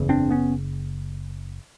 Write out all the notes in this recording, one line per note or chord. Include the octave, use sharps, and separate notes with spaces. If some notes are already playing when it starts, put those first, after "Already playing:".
Already playing: F#1 E2 C#3
C4 D4
B3 C#4